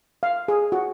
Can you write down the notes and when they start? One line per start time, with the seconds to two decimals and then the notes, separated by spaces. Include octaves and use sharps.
0.23 F5
0.48 G#4
0.72 F#4